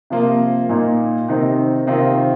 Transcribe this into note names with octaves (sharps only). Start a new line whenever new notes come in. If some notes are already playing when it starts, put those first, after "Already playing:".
C3 F3 A#3 F4
A#2 A#3 D#4
C3 D#3 C4 D#4
C3 D#3 C4 F4